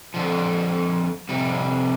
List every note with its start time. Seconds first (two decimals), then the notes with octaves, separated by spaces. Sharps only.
0.14 F2 D3 F3
1.29 F2 C3 G3